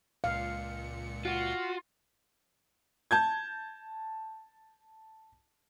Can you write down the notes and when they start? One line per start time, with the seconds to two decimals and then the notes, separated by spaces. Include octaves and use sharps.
0.24 C#2 A#2 F5 C#7
1.25 F4 F#4 F#5
3.11 A5 G6 G#6